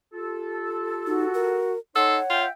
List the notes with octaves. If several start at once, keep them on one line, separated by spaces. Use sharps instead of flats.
F4 G4 A4
D#4 F#4
A#4
D#4 A4 C#5 D#5 F#5 C6
F4 E5 G5